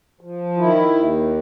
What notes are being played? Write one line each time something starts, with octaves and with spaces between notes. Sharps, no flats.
F3
D#3 E4
D#2